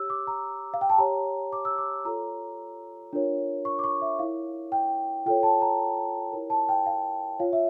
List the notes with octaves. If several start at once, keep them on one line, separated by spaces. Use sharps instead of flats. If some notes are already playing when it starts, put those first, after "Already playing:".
Already playing: G4 C#5 E6
D6
A#5
F5
G5
A5
G4 C#5 A#5
D6
E6
D6
F4 A4 C#5 A#5
D4 F4 A#4 C#5
C#6
D6
C#6
E5
E4 A#4 C#5 F5
G5
F4 A4 C#5 G5
A5
A#5
E4 G4 A#4 C#5
A5
G5
F5
F4 C#5 F5
E5